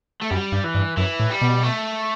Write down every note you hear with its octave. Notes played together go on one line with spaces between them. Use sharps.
A3
F#2 G3
G2
E3
G2
F#2 E3
A2
G3
B2
A3